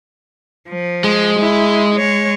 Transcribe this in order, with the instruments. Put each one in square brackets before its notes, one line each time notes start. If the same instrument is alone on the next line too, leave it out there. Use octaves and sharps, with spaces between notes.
[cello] F3
[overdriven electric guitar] G#3
[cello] E4
G#3 C#5